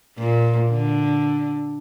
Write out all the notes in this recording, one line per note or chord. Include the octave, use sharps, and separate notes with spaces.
A#2
D3